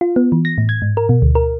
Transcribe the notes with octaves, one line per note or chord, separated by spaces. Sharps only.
F4
B3
E3
A#6
A2
G#6
G#2
A#4
B2
D2
A#4